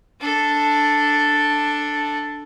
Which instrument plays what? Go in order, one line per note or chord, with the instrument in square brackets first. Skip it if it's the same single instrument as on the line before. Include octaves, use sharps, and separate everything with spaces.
[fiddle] D4 A4